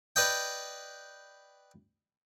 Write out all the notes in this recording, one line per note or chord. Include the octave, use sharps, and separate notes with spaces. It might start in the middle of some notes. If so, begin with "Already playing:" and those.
B4 D5 D#5 G5